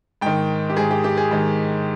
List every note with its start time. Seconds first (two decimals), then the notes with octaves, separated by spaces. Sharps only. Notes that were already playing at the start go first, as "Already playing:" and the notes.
0.21 G#2 D#3 G5
0.70 G4
0.76 G#2 D#3 G#4
0.91 G4
1.04 G4
1.17 G#4
1.31 G#2 D#3